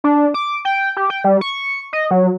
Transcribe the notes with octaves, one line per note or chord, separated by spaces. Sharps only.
D4
D6
G5
G4
G5
G3
C#6
D#5
F#3